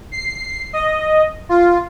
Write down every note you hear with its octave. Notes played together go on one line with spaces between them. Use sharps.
C7
D#5
F4